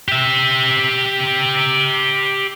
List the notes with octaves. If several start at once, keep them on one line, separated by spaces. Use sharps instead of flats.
G4 E5